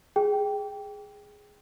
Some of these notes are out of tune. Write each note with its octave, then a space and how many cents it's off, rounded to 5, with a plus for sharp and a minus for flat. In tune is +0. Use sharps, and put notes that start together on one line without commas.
G#4 +0 G5 +0